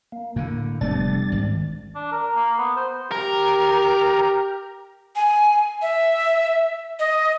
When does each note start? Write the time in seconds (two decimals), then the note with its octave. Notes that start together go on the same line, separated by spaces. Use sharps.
0.12 A#3
0.36 A2 D3
0.81 F1 G3 A3 B3 D4 A6
1.32 G#1
1.95 D4
2.11 A#4
2.35 A#3
2.58 B3
2.76 C5
3.12 G4 A#4
5.16 G#5
5.82 E5
6.99 D#5